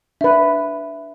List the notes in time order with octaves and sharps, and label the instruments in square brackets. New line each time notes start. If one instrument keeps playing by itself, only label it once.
[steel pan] D4 B4 [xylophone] E5